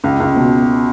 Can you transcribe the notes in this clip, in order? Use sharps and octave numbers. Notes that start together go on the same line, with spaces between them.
C#2
C#2
B2